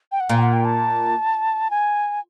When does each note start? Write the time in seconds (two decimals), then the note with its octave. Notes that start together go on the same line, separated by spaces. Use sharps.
0.12 G5
0.20 F#5
0.29 A#2 F5
0.37 G5
0.41 F#5
0.53 G5
0.65 A5
1.70 G#5